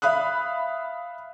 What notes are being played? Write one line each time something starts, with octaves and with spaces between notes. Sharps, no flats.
E5 F5 B5 D#6 F#6